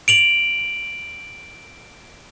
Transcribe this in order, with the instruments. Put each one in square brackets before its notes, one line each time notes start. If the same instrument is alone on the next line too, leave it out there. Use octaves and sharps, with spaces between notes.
[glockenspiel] D7 F7 F#7